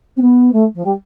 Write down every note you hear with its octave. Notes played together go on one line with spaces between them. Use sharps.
C4
B3
A3
F3
G3